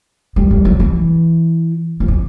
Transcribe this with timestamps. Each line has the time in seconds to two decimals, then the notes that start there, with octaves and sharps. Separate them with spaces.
0.36 G3
0.51 G3
0.65 F#3
0.80 E3
2.00 F3
2.08 E3